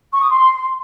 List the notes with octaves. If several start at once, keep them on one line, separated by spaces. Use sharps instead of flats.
C#6
D#6
C6